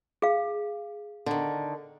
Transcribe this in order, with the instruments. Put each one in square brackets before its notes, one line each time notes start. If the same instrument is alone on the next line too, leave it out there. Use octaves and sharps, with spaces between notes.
[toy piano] G#4 F5
[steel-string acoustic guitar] D3 D#3